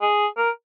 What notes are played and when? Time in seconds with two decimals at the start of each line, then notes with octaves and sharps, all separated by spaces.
0.02 G#4
0.37 A#4